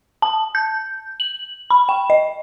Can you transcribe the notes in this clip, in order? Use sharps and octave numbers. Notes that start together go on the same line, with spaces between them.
A5
G6
F#7
B5
G5
D#5